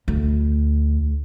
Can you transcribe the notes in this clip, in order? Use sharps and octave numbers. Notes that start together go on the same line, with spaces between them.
D2